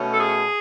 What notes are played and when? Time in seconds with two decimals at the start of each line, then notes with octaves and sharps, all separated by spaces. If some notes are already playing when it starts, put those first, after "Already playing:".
Already playing: B2 A3 C#4
0.12 A4
0.19 G#4